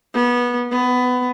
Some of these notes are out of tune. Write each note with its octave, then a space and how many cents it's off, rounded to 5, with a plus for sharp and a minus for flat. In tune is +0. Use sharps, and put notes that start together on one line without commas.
B3 -20
B3 +20